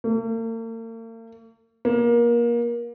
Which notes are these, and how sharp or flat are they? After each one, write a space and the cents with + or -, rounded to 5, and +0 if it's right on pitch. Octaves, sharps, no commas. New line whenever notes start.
A#3 -45
A#3 +25